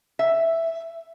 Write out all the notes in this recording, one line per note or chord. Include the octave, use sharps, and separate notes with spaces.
E5